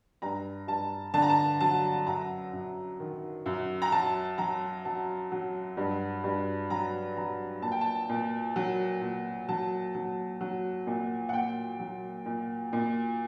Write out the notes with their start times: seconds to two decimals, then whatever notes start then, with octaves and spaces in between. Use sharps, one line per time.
0.22 G2 A#5
0.68 G2 A5
1.14 D3 A5
1.22 A#5
1.29 A5
1.60 F#3 A5
2.07 F#2 A#5
2.53 F#2
3.00 D#3
3.46 F#2
3.82 A#5
3.92 F#3 A5
4.38 F#3 A#5
4.85 F#3 A5
5.32 F#3
5.77 G2
6.24 G2
6.70 F#3 A#5
7.17 F#3 A#5
7.62 A#2 A5
7.72 G5
7.81 A5
8.09 A#2
8.56 F#3
9.01 A#2
9.49 F#3 A5
9.95 F#3
10.41 F#3
10.87 A#2
11.29 F#5
11.33 A#2 G5
11.80 F#3
12.26 A#2
12.73 A#2